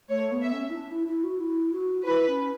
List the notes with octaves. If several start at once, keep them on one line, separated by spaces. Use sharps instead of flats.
A3 C#5
B3
E5
C#4
E4
D4
E4
E4
F#4
E4
F#4
E4 B4
C#4